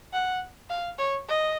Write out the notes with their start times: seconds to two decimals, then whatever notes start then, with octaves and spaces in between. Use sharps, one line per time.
0.13 F#5
0.70 F5
0.99 C#5
1.29 D#5